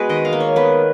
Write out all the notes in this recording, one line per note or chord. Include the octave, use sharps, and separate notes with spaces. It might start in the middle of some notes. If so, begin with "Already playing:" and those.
Already playing: G#3 B3 F#4 G#4 B4
D#3 D#5
F5
A#3
C#5
B3 B4